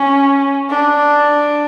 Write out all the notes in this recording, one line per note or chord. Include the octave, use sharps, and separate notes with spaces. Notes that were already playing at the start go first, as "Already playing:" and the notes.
Already playing: C#4
D4